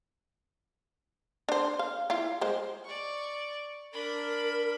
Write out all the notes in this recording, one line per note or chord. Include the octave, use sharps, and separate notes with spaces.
D4 C5
F5
E4 F4
G#3 C5
D5 C#6
D4 A#4 B5